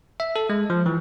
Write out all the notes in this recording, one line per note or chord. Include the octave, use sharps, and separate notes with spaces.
E5
A4
G#3
F3
E3